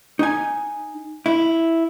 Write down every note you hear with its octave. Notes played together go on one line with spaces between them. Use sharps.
D#4 G#5
E4